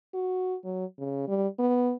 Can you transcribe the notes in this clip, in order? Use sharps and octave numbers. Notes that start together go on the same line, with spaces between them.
F#4
F#3
C#3
G3
B3